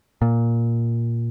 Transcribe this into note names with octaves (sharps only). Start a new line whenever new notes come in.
A#2